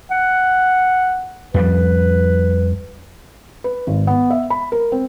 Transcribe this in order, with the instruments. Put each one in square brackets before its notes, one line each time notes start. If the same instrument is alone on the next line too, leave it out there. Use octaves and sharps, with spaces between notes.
[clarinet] F#5
[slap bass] F2 F3 G3 [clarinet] B4
[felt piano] B4
G#1
B3
E5
B5
A#4
C4